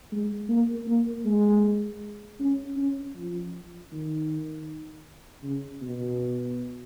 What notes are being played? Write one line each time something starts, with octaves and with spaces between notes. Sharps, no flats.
G#3
A#3
A#3
G#3
C#4
C#4
F3
D#3
C#3
B2